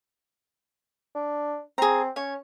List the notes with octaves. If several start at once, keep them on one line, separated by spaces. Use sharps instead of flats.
D4
C4 G#4 A#5
C#4 C#5